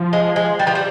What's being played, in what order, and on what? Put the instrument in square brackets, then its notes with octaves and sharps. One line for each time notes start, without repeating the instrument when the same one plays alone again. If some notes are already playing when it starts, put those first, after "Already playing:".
Already playing: [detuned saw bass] F3
[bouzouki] G#3
G#3
G3
F3
G3